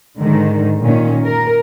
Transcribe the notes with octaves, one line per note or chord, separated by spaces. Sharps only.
G#2 D3 D#3 G#3
A#2 D#3 C#4
A#4